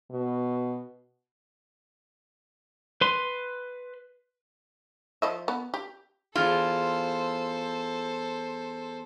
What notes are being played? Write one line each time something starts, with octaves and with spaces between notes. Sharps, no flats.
B2
B4 C6
F3 D#5 E5
B3
G4
E2 F4 A4 C5